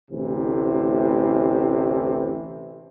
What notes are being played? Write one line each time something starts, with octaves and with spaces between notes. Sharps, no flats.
A1 D2 C3 E3